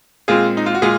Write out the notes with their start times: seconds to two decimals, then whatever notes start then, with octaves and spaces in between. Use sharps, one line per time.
0.28 A#2 G#3 C4 F4 G#4
0.57 D#4
0.66 F4
0.75 F#4
0.82 A#2 G#3 F4 G#4